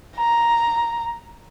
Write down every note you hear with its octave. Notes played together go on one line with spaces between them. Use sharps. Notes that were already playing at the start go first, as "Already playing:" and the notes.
A#5